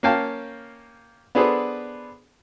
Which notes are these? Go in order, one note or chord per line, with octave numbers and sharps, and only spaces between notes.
A#3 C#4 F5 G5 A5
B3 D4 G#4 A4 B4 C5